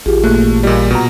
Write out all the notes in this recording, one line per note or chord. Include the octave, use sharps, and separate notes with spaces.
A1 F4 G4 G#4
A#2 A3 A#3 F#6
A#2 G3 F4 D#5
B2 A#5